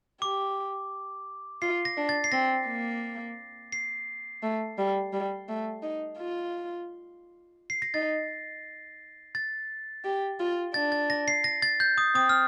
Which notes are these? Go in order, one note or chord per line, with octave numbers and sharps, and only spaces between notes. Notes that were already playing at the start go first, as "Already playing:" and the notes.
G4 D6
F4 C7
A#6
D4
A6
C7
C4 A#6
A#3
C7
A3
G3
G3
A3
D#4
F4
C7
A#6
D#4 A6
A6
G4
F4
D4 A6
A6
A#6
C7
A#6
A6
G6
D#6
C4 D#6
F6